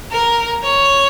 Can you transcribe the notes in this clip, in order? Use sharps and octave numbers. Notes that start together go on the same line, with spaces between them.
A#4
C#5